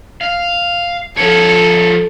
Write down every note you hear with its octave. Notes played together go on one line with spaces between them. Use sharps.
F5
F3 A4 C#5